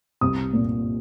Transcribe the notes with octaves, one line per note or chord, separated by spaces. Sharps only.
C2 D#6
A#2